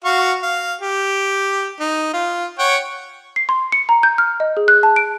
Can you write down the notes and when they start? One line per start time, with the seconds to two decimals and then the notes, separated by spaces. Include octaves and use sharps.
0.04 F#4 F5 C#6
0.43 F5
0.81 G4
1.80 D#4
2.13 F4
2.59 C#5 F#5 G5
3.36 C7
3.49 C6
3.72 C#7
3.89 A#5
4.03 G6
4.18 F6
4.40 D#5
4.57 G#4
4.68 F#6
4.83 A5
4.96 D7